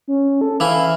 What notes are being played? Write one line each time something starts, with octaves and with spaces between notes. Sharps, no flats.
C#4
A4
E3 E4 F5